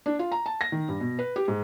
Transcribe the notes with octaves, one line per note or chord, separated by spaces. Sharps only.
D4
F4
A#5
A5
A#6
D#3
G2
B2
B4
G4
G#2